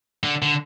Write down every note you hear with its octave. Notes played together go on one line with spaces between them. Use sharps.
D3
D3